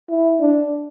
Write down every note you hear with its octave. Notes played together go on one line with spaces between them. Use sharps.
E4
D4